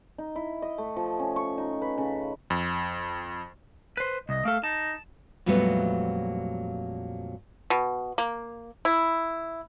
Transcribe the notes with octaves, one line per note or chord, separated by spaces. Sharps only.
D#4
E4
D#5
A3
F3
C#4
C#6
D#4
B4
C#3
F2
B4 C5
C2 D#5
A3 A4 F5
D#4 A5
F2 A#2 F#3 G3 A3 B3
B2
A#3
E4